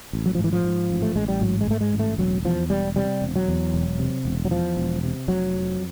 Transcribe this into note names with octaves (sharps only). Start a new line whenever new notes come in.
A1
F#3
G#2 F3
E3
F3
G#2
A1
A3
A1 G#3
G3
G#2 F#3
G#3
G#2 A3
G#3
A1
A3
E1 F#3
E2 F3
E1 G3
C3 G3
E1
F#3
E2
E1
C3
E1
F#3
E2 F3
E1
C3
F1 F#3
F2